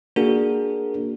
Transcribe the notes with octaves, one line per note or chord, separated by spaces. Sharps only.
A#3 D4 F#4 G#4 A#4